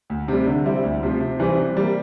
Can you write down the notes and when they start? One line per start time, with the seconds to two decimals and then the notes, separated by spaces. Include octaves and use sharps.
0.10 D2
0.28 C3 G3
0.47 D3
0.65 G3 C4 E4
0.84 D2
1.03 C3 F3
1.21 C3
1.40 E3 G3 C4
1.58 C3
1.77 G3 A#3